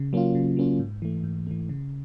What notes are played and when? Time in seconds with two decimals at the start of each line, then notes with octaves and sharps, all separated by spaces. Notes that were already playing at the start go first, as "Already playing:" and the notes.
Already playing: C#3
0.13 F#3 A#3 C#4 F4
0.35 C#3
0.57 F#3 A#3 C#4 F4
0.79 G#2
1.02 E3 A3
1.24 G#2
1.47 E3 A3
1.69 C#3